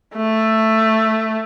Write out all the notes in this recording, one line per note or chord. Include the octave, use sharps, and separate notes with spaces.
A3